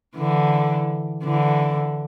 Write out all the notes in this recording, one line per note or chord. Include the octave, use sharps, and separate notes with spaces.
D3 E3
D3 E3